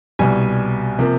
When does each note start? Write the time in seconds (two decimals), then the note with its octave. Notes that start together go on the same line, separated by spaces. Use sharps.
0.19 C2 B2 G3 G#5
0.99 C3 F3 A#3